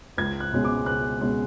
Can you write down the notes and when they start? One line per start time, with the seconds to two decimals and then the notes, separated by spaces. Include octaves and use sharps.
0.17 C#2 G#6
0.40 F#6
0.53 B2 G#3 C#4
0.65 D6
0.86 C#2 F#6
1.21 B2 G#3 C#4